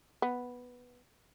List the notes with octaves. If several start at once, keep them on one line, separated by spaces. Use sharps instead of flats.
B3